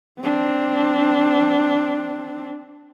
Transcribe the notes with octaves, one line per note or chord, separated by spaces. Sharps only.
C4 D4